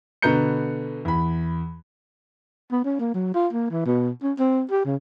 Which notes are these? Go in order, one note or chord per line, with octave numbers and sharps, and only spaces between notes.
B2 D3 B4 A#5 G6 C#7
E2 B5
B3
C#4
A#3
F#3
F4
A#3
E3
B2
C#4
C4
G4
C#3